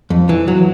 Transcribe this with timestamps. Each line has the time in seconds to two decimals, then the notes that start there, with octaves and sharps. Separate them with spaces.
0.10 F2
0.29 E3
0.48 F#3